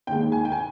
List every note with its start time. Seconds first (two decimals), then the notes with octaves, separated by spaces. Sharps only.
0.07 D#2 D#3 G#3 G5
0.32 G#5
0.45 G5
0.52 G#5